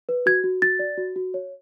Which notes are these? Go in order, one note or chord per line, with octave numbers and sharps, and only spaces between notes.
B4
F#4 G#6
F#4
F#4 A6
D5
F#4
F#4
C#5